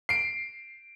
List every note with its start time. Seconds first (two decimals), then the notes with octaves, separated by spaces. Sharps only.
0.09 C7 D7